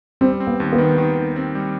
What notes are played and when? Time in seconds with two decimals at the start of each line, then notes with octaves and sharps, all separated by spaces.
0.21 G3 C4
0.40 C4
0.47 B3
0.60 D#2
0.73 B3
0.78 D#3
0.98 D#3
1.17 D#3
1.36 C4
1.55 G3